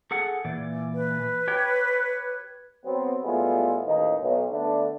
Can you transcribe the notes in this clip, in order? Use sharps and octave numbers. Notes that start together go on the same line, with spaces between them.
G#4 A4 F#5
A#2 E3 D5
B4
G4 C#5 G5
F#3 B3 C4
A2 G3 G#3 B3 E4 F4
A1 D#2 D#3 D#4
B1
D3 A3 B3 D4